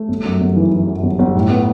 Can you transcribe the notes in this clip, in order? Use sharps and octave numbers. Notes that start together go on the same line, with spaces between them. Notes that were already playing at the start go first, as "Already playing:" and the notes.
Already playing: A3
G1
F#2
G1
E3
E3
F#2
G1
G1
A2
B3